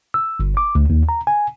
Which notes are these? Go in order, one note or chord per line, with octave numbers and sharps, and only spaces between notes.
E6
G1
D6
D2
D#2
A#5
G#5